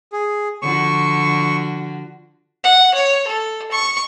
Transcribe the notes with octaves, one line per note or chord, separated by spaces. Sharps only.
G#4
D3 F3 F#4 C#6
F#5
C#5
A4
C#6